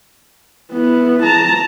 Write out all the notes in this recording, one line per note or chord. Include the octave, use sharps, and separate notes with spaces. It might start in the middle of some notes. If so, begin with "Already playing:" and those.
B3 E4
A5 A#5